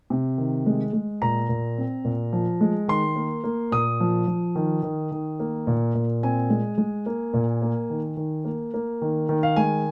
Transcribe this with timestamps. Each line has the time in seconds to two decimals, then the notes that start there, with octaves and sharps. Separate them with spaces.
0.10 C3
0.38 D#3
0.66 G#3
0.93 G#3
1.22 A#2 A#5
1.49 A#2
1.78 C4
2.05 A#2
2.33 F3
2.61 G#3
2.88 D#3 C6
3.16 A#3
3.44 A#3
3.72 A#2 D#6
4.00 F3
4.27 F3
4.55 D#3
4.83 D#3
5.12 D#3
5.40 A#3
5.67 A#2
5.94 A#2
6.23 C4 G#5
6.50 G#3
6.78 G#3
7.06 A#3
7.33 A#2
7.62 A#3
7.90 D#3
8.17 D#3
8.45 A#3
8.74 A#3
9.02 D#3
9.29 D#3
9.43 F5
9.56 G#3 G#5